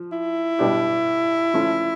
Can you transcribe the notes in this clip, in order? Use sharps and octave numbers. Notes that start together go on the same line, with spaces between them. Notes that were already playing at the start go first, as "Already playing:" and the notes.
Already playing: F3
E4
B2 G3 B3 D4 G4
F3 A3 C#4 F4